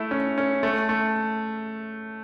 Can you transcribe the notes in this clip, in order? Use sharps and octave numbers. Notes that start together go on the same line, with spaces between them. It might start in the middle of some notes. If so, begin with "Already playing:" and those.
Already playing: A3 E4
C#4
C#4
A3
A3